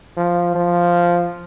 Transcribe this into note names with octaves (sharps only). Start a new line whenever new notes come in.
F3
F3